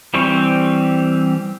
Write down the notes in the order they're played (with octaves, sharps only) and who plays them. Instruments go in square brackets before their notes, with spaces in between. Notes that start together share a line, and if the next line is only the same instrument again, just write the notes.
[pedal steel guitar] E3 G3 C4 G4 C#6